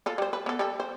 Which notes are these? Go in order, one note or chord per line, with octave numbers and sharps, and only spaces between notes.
F4 A4
G3 C5
B4
B3 A4
G3 A4
C5